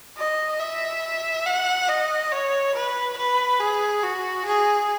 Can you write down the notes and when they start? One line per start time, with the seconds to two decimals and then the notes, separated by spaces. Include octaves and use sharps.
0.17 D#5
0.59 E5
1.46 F#5
1.88 D#5
2.32 C#5
2.75 B4
3.17 B4
3.60 G#4
4.03 F#4
4.46 G#4